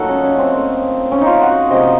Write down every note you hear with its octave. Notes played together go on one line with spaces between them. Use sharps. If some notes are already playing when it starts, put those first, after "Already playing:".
Already playing: A#2 F#3 A3 D#4 F#4 A4
C#4
C#4
C4
A2 F3 A#3
C#4
D#4
F4
F#4
C3 F3 A#3 D#5